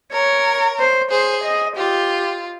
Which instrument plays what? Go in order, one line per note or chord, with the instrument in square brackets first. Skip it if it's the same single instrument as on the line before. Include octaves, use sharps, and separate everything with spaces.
[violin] A#4 [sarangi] C#5
[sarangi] C5
[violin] G#4 [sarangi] C5
[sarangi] D#5
[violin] F4 [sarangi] G4